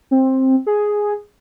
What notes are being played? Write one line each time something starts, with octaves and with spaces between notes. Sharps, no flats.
C4
G#4